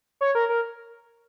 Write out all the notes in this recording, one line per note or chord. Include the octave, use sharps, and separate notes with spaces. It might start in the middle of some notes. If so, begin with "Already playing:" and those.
C#5
A#4
A#4